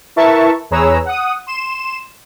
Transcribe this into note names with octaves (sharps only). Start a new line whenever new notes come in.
E4 A#4 B4 E5 A5 C#6
E2 G#4 B4 C#5 A#5 E6
F#5 D#6
C6 E7